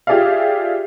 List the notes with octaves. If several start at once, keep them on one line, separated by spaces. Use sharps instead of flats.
F4 G4 G#4 D5 E5 F5